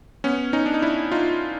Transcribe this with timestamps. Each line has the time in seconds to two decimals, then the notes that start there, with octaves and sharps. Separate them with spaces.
0.24 B3 C#4
0.53 C#4 D#4
0.66 D4
0.74 D#4
0.82 D4 E4
1.11 D#4 F4